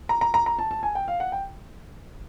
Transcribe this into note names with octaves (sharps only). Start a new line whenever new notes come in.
A#5
A#5
A#5
A#5
A5
A5
G#5
G5
F5
F#5
G5